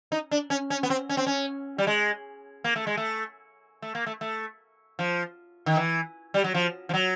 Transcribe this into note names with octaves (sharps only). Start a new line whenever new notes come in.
D#4
D4
C#4
C#4
B3
C4
C#4
C4
C#4
G3
G#3
A#3
A3
G#3
A3
A3
A#3
A3
A3
F3
D#3
E3
G3
F#3
F3
F3
F#3